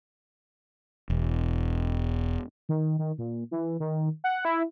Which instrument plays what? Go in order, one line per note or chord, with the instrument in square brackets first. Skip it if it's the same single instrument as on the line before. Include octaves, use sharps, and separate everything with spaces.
[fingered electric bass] E1
[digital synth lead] D#3
D#3
A#2
E3
D#3
F#5
E4